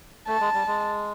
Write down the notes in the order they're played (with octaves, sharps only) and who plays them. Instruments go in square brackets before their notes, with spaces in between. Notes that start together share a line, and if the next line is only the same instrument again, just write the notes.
[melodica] A3 [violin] A5
[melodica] G#3
G3
G#3